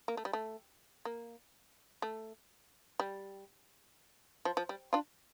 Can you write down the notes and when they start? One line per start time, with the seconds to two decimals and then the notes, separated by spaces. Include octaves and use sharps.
0.08 A#3
0.17 A3
0.25 G3
0.33 A3
1.05 A#3
2.02 A3
3.00 G3
4.45 F3
4.57 F3
4.69 G3
4.93 D4 F4